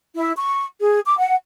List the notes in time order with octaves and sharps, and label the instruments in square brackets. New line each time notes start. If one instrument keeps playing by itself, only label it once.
[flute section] E4
C#6
G#4
D6
F#5